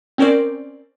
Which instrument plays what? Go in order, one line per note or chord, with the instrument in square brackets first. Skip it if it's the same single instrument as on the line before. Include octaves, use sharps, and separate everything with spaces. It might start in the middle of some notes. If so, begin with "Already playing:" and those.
[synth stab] C4 C#4 A#4 C5 D5